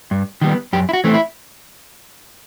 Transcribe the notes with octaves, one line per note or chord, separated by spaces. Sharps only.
G2
D#3 G3 B3
F#2 G4
E4
F#4
E3 A3 C4
E4